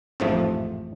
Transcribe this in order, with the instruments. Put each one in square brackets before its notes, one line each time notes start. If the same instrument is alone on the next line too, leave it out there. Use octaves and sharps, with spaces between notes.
[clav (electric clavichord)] A1 F2 G#2 C3 F3 A3